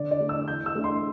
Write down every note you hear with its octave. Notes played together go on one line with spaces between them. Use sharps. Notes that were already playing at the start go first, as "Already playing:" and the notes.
Already playing: D3 D5
D5
A3 D4
E6
E3 G6
E6
A3 D4
C6